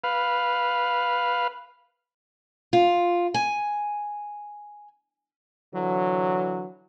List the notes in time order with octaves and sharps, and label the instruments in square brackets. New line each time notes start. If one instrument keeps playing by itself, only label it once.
[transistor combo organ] B4 F5
[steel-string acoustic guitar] F4
G#5
[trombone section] D3 E3 F#3